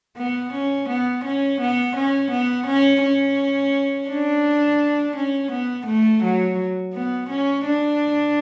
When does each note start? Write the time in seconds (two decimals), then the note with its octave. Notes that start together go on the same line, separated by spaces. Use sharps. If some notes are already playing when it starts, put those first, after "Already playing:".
0.17 B3
0.53 C#4
0.89 B3
1.24 C#4
1.60 B3
1.96 C#4
2.30 B3
2.66 C#4
3.02 C#4
4.08 D4
5.16 C#4
5.51 B3
5.86 A3
6.23 F#3
6.94 B3
7.29 C#4
7.65 D4